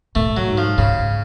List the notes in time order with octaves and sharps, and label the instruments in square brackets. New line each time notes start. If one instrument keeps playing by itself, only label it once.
[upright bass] A2 [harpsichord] A3
[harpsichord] F#3
[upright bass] G#2
[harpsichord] F3
[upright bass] G#2 [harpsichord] C#3